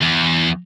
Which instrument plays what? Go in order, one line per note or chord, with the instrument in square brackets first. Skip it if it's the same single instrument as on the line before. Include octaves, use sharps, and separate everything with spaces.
[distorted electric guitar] E2